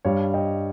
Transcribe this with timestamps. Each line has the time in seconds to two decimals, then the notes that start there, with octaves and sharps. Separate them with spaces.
0.05 G2 G3 C#5 F5
0.34 D#5 G5